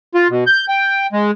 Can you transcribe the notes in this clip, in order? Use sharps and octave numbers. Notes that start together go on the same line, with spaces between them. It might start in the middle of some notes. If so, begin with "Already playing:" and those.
F4
B2
G6
G5
G#3